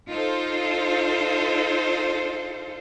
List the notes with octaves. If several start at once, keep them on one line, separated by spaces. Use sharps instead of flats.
D#4 F4 A4 C5